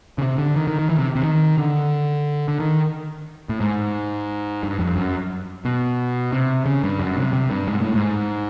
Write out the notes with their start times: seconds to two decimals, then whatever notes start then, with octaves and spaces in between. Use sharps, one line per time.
0.18 C#3
0.22 C3
0.38 D3
0.56 D#3
0.67 D#3
0.79 D#3
0.89 E3
0.98 C3
1.15 C3
1.23 D#3
1.58 D3
2.48 D3
2.60 D#3
3.49 A2
3.60 G#2
4.63 G2
4.79 F2
4.96 F#2
5.65 B2
6.33 C3
6.66 C#3
6.83 G2
7.00 F#2
7.17 C3
7.33 C3
7.51 G2
7.68 G#2
7.82 A2
7.95 G#2